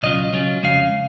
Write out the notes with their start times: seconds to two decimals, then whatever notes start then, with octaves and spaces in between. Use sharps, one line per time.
0.03 C#2 B2 F#3 C#4 F4 D#5
0.33 C#3 F#3 C#4 F4
0.63 F2 C#3 G#3 C#4 F5